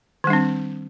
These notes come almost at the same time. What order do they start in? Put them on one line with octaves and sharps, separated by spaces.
D#3 G3 D4 C4